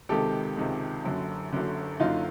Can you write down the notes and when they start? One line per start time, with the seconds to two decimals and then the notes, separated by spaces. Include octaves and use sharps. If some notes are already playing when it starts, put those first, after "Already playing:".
0.09 C#2 C3 D#3 G#3 G4 A4
0.57 C#2 C3 D#3 G#3
1.04 F#1 F#2 D3
1.52 F#1 F#2 D3
2.00 F#1 F#2 D3 D#4 F4